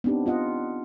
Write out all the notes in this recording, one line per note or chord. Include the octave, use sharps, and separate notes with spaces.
B3 C4 D4 D#4 G4
B3 F4 D#5 F#5